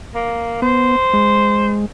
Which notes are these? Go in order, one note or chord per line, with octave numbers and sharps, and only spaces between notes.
A#3
B3 C5
G#3